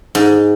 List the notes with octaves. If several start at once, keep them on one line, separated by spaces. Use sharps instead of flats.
G#2